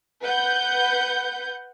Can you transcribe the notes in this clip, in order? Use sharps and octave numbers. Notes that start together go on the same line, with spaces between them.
B4 F#5 G6